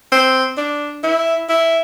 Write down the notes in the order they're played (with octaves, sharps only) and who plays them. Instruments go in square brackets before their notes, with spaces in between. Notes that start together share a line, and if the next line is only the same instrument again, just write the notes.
[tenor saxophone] C4
D4
E4
E4